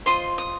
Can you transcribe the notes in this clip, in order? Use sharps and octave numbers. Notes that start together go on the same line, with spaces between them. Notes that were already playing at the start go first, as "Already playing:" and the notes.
F4 C5 D#5 C6
D#6